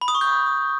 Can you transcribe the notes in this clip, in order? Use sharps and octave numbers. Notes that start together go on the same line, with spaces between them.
B5
D#6
C#6
G6